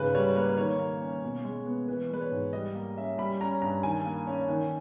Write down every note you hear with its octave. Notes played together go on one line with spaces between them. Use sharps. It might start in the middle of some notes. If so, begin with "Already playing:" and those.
Already playing: G#2 C#3 B4
G3 C#5
A#3 B4
D#3 C#5
A#3
C#4
B2
G#3
B3
E3 B4
G#3 B4
C#5
G#2
G3 D#5
A#3
C#4 E5
G3 B5
C#4 A#5
G2 A#5
D#3 G#5
A#3
C#4
D#3